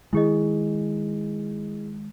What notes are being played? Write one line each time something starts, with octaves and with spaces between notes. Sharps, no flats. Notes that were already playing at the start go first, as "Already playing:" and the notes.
D#3 G#3 E4 G#4 D#5